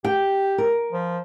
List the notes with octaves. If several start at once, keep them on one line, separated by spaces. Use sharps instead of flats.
G4 G5
A#4
F3